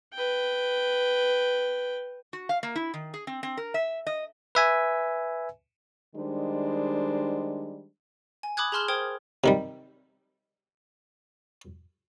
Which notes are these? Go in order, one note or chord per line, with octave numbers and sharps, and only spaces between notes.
B4 G5
F#4
F5
A#3
E4
D#3
G#4
C4
C4
A#4
E5
D#5
B4 E5 G#5
D#3 G3 G#3 D4 C5
G#5
B5 D6 D#6 F#6 G#6
G#4 A5 C6 F6 E7 G7
A#4 C5 G5 D#6 G#6
C3 D#3 G3